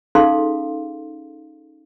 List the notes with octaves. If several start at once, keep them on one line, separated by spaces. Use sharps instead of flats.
C#4 D#4 G#4 A4 F5 C6